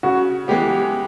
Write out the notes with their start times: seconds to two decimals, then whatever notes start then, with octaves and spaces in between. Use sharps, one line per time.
0.03 C#3 F#4
0.48 E3 G#3 B3 G4